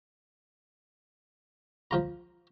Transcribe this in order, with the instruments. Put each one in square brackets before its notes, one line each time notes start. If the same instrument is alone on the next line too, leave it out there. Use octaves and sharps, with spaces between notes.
[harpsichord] F3 F4 A#5